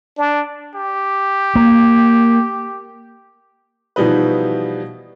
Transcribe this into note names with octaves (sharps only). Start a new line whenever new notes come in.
D4
G4
A#3
B2 E3 F3 G3 D#4 B4